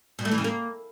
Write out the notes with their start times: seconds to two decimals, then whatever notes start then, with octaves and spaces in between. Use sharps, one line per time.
0.19 B2
0.25 A3
0.31 E3
0.38 C#3
0.44 A#3